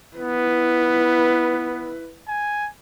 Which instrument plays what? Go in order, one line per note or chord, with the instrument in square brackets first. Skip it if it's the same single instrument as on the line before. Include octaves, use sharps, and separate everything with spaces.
[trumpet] B3 [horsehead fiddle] E4 B4
[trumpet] G#5